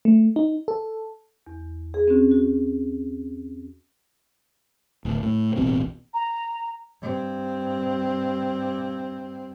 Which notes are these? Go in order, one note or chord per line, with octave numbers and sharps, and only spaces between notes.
A3
D#4
A4
E2
G#4
C4 C#4 F#4
F#4
D1
A2
D#1 A1 B2 C4
A#5
G2 C4